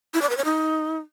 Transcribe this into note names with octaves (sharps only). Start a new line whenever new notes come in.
E4
D5
B4
C#5
D#4